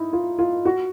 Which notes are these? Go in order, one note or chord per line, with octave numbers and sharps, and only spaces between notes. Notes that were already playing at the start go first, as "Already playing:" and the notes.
Already playing: D#4 E4
F4
F4
F#4